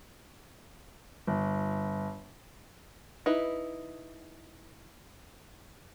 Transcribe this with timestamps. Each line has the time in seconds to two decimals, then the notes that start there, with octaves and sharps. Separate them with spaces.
1.27 G1
3.26 D#4 E4 B4